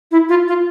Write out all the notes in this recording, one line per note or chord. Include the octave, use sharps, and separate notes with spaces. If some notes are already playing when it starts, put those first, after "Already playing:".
E4
F4
F4